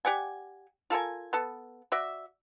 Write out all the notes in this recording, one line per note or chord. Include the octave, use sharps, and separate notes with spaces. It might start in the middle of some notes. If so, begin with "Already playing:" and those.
G4 D5 F#5 G#5
F4 A4 A#4 G#5
B3 A4
F#4 D5 E5